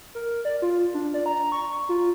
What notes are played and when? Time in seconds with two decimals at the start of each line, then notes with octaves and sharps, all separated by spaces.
0.15 A#4
0.45 D5
0.62 F4
0.94 D4
1.14 D5
1.26 A#5
1.52 C#6
1.89 F4